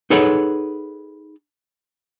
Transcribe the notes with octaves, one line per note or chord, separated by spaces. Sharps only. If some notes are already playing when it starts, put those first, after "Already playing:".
D#4 G#4 A4 B4 C#5 F#5